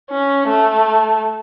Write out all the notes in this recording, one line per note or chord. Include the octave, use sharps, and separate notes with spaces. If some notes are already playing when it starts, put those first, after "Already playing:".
C#4
A3